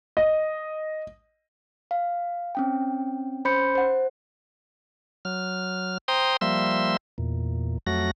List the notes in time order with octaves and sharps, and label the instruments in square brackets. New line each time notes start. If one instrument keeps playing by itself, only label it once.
[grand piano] D#5
[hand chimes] F5
C4 C#4 G5
C#4 C5 B5 C6 G6 C#7
C5 F#5
[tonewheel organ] F#3 F6
C5 G5 A#5 C6 D#6
F3 G3 A#3 E5 C6 E6
E2 A#2
F2 F#3 A3 F#4 A#6